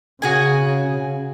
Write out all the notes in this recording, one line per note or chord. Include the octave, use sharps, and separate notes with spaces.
C#3 F#4 G#4 G#5